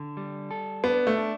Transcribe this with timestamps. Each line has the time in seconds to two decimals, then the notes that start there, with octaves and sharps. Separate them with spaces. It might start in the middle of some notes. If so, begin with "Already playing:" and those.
Already playing: D3
0.17 G3
0.51 A4
0.84 B3 D4
1.07 A3
1.18 D4